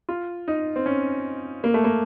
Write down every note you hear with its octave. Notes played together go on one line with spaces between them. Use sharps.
F4
D#4
C4
C#4
A#3
A3
A#3